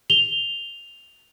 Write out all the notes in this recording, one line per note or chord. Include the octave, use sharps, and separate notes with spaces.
F7 G7